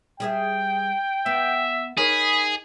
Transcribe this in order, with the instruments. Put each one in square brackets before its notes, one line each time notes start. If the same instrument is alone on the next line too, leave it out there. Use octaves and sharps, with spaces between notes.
[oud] G3 G#4 E5 [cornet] G5
[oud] B3 [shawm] E5
[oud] D#4 A#4 C#5 [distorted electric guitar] G#4 [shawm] B5